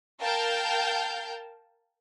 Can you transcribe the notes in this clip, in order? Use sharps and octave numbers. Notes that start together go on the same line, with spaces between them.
A#4 F5 G5 A5 F6 G6